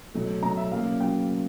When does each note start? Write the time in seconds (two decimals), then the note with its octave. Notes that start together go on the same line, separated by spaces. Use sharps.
0.14 B2 F#3 A3
0.43 B2 F#3 A3 A#5
0.57 E5
0.72 C#3 F#3 A#3 F5
1.00 C#3 F#3 G5